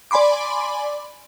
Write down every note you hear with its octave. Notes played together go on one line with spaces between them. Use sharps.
D5 G#5 B5 C6 D6